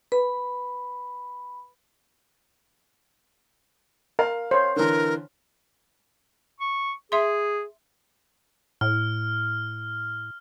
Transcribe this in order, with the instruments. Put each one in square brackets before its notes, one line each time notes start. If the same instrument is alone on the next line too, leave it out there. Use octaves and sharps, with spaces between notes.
[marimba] B4 [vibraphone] B5
[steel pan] A#4 [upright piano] F5
[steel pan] C5 C#5
[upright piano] D3 E3 [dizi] A#4
[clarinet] C#6
[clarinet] G#4 [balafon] E5 C6
[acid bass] A2 [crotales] F6